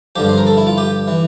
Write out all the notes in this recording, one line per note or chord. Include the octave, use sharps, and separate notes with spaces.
G2 D3 F3 G4
C5
A#4
A4
E4
F4
G4
E3